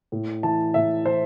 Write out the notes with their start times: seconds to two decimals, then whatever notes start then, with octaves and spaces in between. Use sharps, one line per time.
0.12 A2
0.43 E3 A5
0.74 A2 E5
1.06 E3 C5